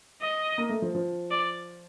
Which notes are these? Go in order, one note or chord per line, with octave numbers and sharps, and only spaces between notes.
D#5
A#3
A3
F3
F3
D5